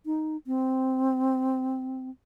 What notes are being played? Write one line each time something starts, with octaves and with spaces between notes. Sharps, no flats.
D#4
C4